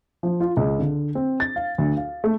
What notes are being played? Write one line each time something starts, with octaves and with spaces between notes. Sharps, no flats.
F3
F4
C#2
D3
C4
A6
F5
D2
F5
A3